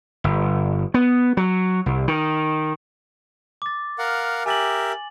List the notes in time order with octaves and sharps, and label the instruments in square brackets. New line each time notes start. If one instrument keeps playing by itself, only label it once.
[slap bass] G1
B3
F#3
C2
D#3
[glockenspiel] D6 A6
[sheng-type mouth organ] A#4 F5 F#5
[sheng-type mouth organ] G4 A#4 E5 [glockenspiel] G#5 A6 F#7